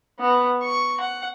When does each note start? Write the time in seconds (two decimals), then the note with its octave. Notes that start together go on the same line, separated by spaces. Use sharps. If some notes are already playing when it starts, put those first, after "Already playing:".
0.20 B3
0.63 C#6
1.00 F#5